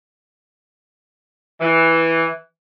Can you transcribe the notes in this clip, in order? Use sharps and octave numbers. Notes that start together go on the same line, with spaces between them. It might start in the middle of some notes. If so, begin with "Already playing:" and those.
E3